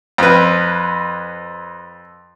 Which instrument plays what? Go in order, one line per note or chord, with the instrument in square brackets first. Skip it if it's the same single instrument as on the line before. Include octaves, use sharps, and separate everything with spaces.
[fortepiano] F2 B4